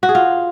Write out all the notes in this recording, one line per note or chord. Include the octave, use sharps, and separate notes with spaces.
F#4
G#4
F4